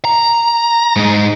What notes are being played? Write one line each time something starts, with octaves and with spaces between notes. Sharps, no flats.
A#5
G#2 D#4